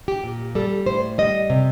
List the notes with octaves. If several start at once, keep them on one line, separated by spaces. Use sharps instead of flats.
G4
A#2
G3 A4
A2 C5
G3 D#5
C3